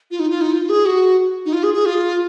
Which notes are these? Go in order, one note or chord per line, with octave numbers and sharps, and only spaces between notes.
F4
D#4
F4
D#4
F4
G#4
F#4
D#4
F4
G#4
G#4
F4